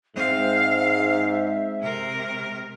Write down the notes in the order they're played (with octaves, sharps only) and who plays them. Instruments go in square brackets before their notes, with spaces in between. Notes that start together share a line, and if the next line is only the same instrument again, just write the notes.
[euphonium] G#2 [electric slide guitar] G#3 C4 [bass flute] E5 [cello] F5
[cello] C3 A#4